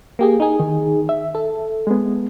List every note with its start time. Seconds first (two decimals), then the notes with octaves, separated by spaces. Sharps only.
0.19 A#3 G4 G#4
0.40 D#4 G#4
0.60 D#3
1.09 E5
1.35 A4
1.87 G#3 B3